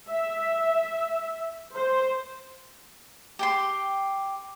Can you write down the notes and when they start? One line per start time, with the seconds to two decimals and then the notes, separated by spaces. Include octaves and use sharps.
0.10 E5
1.76 C5
3.39 G4 G5 C6